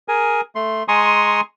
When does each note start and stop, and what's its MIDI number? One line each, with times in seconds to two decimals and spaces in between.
0.08 0.41 68
0.08 0.41 70
0.08 0.41 80
0.55 0.83 57
0.55 0.83 84
0.88 1.41 56
0.88 1.41 80
0.88 1.41 82
0.88 1.41 84
0.88 1.41 85
0.88 1.41 87